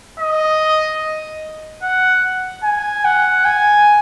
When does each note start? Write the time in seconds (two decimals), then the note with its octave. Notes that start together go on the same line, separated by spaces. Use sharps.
0.20 D#5
1.83 F#5
2.64 G#5
3.05 F#5
3.45 G#5